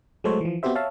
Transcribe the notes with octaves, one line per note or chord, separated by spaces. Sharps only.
F#3 G#3 A3 A4 C5 C#5
E3 F3
B3 C4 F#4 G4 C5 E5
C#5 E5 F5 A5